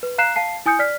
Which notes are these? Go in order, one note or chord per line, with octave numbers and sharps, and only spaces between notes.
B4
F5 A#5 F#6 C7 E7
F5 A5 C7
E4 G#5 D#6 G6 C#7
D5 F6 B6